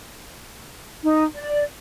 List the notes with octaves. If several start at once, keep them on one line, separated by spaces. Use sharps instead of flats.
D#4
D5